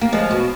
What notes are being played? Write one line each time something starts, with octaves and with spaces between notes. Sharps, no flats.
A#3
F3 G#3
B2